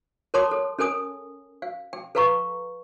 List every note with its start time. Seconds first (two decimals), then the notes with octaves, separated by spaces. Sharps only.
0.34 A#4 C#5 A5 C6 D6 D#6
0.51 A4
0.79 C#4 A4 A#4 G#5 D#6
1.62 F5
1.93 G5
2.15 A4 B4 F5 A#5 C#6